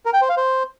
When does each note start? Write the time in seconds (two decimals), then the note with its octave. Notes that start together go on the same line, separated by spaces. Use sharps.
0.06 A#4
0.13 G5
0.21 C5
0.29 F5
0.37 C5